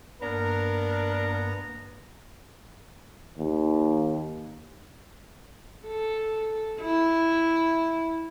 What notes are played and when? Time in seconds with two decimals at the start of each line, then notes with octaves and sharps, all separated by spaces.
0.22 G2 A#3 B3 D4 A#4 A#5
3.38 D#2
5.86 A4
6.81 E4